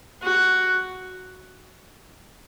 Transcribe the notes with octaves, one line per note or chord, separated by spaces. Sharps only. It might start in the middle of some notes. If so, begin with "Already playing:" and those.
F#4